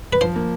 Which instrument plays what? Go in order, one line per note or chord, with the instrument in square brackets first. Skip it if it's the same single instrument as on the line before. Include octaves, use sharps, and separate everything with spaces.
[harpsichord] B4
[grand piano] F3 [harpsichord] C5
[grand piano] A#3